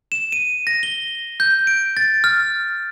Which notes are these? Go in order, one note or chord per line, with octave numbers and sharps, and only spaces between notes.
E7
D#7
A#6
G7
G6
D7
A6
F6